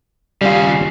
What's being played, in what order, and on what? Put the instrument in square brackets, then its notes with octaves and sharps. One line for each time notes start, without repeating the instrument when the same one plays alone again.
[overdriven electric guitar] D#2 C#3 [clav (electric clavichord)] G3 F4